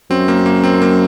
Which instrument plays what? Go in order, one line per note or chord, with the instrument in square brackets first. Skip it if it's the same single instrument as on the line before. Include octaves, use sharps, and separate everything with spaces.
[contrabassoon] F#2 [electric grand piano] C4
[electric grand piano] A#3
A#3
C4
A#3